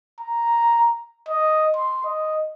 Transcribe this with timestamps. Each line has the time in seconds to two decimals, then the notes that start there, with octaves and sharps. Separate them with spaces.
0.20 A#5
1.29 D#5
1.76 C6
2.04 D#5